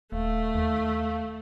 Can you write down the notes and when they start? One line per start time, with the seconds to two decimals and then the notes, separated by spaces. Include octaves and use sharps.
0.12 D#1 A3 F5
0.55 D#2